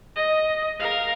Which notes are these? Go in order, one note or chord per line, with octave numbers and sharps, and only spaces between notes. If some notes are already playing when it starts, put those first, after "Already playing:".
D#5
A#4 F5